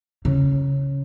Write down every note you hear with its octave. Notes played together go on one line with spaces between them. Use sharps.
C#3